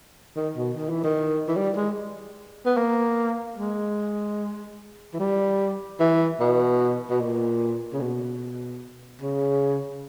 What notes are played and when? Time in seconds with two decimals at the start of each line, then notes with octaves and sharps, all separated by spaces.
0.36 D#3
0.56 B2
0.76 D#3
0.90 E3
1.04 D#3
1.48 E3
1.56 G3
1.76 G#3
2.66 B3
2.77 A#3
3.57 G#3
5.13 E3
5.19 G3
5.99 E3
6.40 B2
7.09 B2
7.20 A#2
7.93 C#3
8.00 B2
9.21 C#3